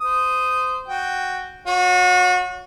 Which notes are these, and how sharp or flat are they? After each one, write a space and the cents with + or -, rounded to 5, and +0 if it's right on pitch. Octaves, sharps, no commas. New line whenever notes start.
C5 -20 D#6 +0
F#4 +0 G5 +0
F#4 -35 C#5 +15